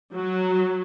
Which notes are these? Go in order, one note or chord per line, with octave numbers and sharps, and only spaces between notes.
F#3